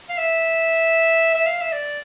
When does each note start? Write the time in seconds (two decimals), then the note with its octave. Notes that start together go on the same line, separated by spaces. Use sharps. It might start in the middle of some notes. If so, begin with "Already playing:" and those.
0.09 F5
0.17 E5
1.35 E5
1.46 F5
1.60 E5
1.72 D5